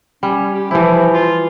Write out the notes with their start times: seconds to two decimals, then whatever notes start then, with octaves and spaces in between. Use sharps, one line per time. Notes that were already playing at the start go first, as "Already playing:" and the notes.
0.23 G3 C#4
0.54 G4
0.71 E3 F3 E4
1.13 F4